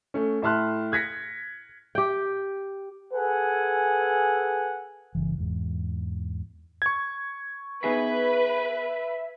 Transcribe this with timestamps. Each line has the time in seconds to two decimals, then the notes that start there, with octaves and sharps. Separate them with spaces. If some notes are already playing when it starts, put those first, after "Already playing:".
0.14 A3 C#4
0.42 A2 E5 A5 C6 F6 F#6
0.92 F#6 G#6 A#6 B6 C#7
1.95 G4 G5
3.13 G#4 A4 B4 F#5 G#5
5.15 G1 C#3 E3
5.38 E2 G#2
6.82 C#6 G#6
7.84 B3 D#4 G#4 B4 E5